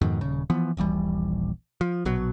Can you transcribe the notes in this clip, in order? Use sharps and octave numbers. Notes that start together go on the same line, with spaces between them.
F2 G#2 B2 D#3
D#1 C#3
E3 F3 B3
D#1 A#1 E3 G3
F3
A#1 B2 F#3